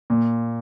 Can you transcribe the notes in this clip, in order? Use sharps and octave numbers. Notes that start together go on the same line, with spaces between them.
A#2